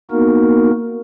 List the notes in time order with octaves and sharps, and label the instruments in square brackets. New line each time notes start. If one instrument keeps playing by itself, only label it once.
[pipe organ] A#3 B3 D#4 F#4 A#4